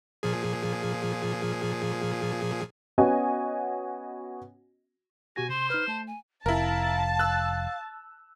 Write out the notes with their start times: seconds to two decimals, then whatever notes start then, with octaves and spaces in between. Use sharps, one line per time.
0.23 A#2 F3 G#4
2.98 B3 C#4 F#4 D#5 G#5
5.36 B2 F#4 G4 G#5 A#6
5.49 C3 C5 C6
5.70 D#4 B4 F6
5.88 A3 A5
6.07 G#5
6.46 F1 E4 A#4 F5 A5
7.19 E6 F#6